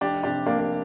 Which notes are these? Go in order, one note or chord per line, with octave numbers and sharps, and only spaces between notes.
F1 D4 G4
C3 D4 G4
F1 A#3 D4
A#3